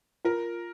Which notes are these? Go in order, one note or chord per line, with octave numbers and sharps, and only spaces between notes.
F4 A#4